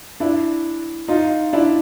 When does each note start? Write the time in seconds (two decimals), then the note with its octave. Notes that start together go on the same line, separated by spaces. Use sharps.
0.20 D4 E4
1.08 D#4 F4
1.53 D4 E4